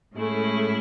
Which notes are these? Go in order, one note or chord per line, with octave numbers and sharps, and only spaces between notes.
A2 G#3 A3 C#4 E4 G#4